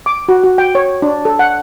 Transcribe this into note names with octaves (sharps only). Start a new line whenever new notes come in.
D6
F#4
F#4
G5
C#5
D4
A4
F#5